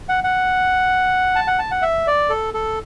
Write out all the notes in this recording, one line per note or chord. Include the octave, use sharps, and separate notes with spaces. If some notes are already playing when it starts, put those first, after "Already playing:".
F#5
F#5
A5
F#5
A5
F#5
E5
D5
A4
A4